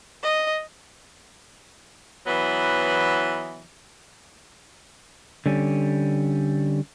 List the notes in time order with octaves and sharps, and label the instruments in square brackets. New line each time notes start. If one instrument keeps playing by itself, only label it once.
[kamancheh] D#5
[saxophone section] E3 F#3 B3
[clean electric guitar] D3 G3 C#4